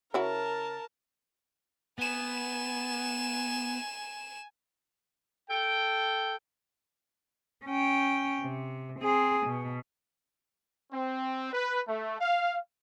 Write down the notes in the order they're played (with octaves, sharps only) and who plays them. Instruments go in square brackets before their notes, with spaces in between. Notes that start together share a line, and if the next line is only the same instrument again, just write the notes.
[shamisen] C#3 E4 F#4 [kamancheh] A#4 A5
[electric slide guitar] B3 [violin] G#5 E7
[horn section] A4 G5
[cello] C#4 G5
C3
C4 G#4
B2
[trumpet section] C4
B4
A3
F5